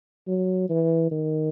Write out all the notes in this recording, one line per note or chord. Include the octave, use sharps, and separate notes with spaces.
F#3
E3
D#3